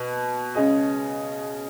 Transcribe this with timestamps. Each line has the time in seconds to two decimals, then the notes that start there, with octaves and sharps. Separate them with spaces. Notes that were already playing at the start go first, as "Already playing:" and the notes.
Already playing: B2
0.55 C#3 G#3 C#4 G#4 D#5